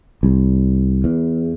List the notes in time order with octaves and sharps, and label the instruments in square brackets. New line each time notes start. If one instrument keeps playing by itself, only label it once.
[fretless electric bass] C2
E2